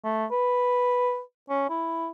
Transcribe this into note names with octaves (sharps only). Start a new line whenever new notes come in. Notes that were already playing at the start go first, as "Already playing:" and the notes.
A3
B4
C#4
E4